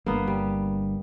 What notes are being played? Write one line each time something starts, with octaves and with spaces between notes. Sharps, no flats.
G1 G2 A#3 B3
G3